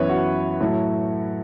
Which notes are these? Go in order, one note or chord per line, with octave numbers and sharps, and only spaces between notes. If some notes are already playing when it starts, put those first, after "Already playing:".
Already playing: F#2 E3 B3 B4 C#5
F#4
A2 F#3 A3